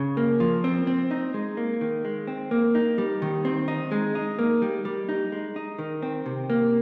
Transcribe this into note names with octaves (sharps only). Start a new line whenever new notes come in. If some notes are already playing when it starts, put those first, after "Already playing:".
Already playing: C#3
A#3
F3
C4
C4
D#4
G#3
A#3
D#3
G#3
C4
A#3
D#4
G3
D#3
C4
D#4
G#3
D#4
A#3
G3
G3
D#4
G#3
D#4
D#3
C4
C3
A#3